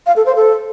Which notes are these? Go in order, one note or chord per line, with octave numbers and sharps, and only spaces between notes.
F5
A4
C5
A4